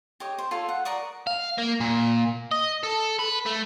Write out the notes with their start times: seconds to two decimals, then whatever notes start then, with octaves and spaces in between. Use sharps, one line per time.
0.20 G4 C#5 D#5
0.38 C5
0.51 F4 A4 C#5
0.69 F#5
0.85 A#4 D5 C#6 D#6
1.27 F5
1.58 A#3
1.80 A#2
2.52 D#5
2.83 A4
3.19 B4
3.46 A3